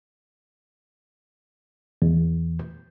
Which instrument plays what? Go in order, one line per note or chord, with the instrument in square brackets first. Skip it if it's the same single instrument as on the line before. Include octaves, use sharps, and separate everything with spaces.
[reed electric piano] E2